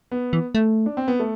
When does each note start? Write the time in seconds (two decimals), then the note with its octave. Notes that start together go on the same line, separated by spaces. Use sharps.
0.12 B3
0.33 E3
0.55 A3
0.86 D4
0.97 C4
1.08 B3
1.20 A3